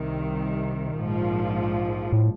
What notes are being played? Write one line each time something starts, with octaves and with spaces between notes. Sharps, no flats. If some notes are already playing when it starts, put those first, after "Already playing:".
Already playing: C2 C3 D#3 G3
A#1 G#2 F3
A2